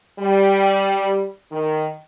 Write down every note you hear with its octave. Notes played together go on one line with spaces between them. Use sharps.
G3
D#3